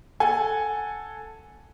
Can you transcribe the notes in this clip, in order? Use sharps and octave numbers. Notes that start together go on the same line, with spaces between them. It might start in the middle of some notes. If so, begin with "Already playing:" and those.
A4 F#5 G#5